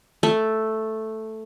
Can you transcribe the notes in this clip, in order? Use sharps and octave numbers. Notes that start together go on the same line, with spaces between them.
A3